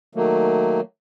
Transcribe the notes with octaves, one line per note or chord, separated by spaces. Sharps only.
D#3 F#3 A3 A#3